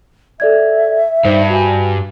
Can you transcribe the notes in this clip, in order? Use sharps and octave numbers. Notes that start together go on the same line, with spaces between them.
A4 D5 E5 G#6
G2 D#4 C5
F#4 G#5